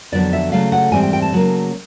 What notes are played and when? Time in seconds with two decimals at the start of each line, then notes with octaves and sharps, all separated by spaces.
0.12 F2 D3 F#3 B3 D5
0.33 E5
0.52 C#3 F#3 A3 F5
0.72 F#5
0.92 G#2 E3 G3 C4 G#5
1.02 G5
1.13 G5
1.22 A5
1.32 C#3 F#3 A#3